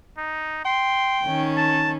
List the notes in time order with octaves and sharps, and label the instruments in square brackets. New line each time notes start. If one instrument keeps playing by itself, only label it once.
[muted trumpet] D#4
[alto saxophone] G5 [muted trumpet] C6
[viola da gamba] D#3 C#4
[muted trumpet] A5